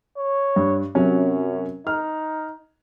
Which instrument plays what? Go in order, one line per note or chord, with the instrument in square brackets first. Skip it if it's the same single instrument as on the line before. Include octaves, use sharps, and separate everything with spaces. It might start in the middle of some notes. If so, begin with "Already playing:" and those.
[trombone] C#5
[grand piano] G2
[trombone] F#2 [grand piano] C3 F#3 C#4
[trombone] D#4 [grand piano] F6